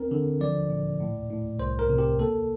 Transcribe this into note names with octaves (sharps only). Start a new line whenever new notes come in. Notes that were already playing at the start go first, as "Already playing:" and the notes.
Already playing: C4 A#4
D3
F3 D5
A#2
A2
A2
C2 C5
A#4
C3
G4
A#3 A4